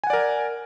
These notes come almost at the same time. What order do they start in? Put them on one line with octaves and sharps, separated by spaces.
G#5 F#5 D5 A#4